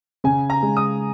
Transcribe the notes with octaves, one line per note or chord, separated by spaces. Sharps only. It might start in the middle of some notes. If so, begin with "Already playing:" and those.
C#3 G#5
A#5
G#3
D#6